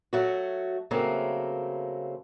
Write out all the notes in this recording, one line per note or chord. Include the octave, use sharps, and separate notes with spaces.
F#3 A3 F#4
C#3 F#3 A3 A#3 C4